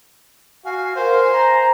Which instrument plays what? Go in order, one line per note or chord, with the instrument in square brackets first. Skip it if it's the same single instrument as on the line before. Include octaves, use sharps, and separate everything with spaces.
[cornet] F#4 [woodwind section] F5 [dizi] G#5
[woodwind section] A#4 F5 [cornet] C5
[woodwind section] A#5